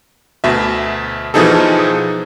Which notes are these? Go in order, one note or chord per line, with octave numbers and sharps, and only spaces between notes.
D2 B2 E5
B2 E3 F3 D#4 G#4 A4